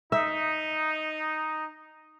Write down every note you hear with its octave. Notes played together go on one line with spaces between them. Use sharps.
D#4 E5